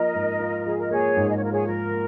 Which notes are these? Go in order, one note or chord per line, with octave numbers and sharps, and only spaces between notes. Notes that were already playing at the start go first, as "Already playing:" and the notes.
Already playing: F3 A#3 F4 A#4 D#5
G#2
F4
F3 G#4
A#4
A#3 G#4 C#5
G#2
D#5
C#5
F4 A#4
G#4 C#5
F3 A#4
A#3